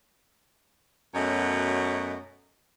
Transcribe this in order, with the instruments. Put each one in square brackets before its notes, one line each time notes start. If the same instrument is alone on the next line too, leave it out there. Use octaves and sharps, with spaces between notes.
[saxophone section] F#2 B2 A3 C#5 D#5